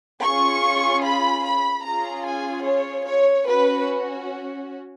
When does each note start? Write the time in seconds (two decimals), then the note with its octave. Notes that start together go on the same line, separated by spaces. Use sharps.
0.23 C#4 F4 G#4 C#6
1.04 B5
1.44 B5
1.84 C#4 F4 G#4 A#5
2.25 G#5
2.65 C#5
3.06 C#5
3.46 C#4 F#4 B4